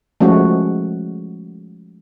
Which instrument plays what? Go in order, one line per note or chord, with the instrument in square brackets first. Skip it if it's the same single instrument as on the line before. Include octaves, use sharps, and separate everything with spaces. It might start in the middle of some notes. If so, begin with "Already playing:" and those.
[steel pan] F3 G#3 A3 C#4 F#4